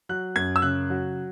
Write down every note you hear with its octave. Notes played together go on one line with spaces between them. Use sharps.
F#3 F#6
F#2 G#6
E6
C#3 F#6
F#3